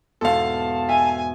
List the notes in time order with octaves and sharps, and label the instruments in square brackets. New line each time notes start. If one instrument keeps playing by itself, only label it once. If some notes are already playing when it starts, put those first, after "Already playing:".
[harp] E2 G#2 B2 [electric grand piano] A4 F5 [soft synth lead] A5
[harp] E5 [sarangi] G#5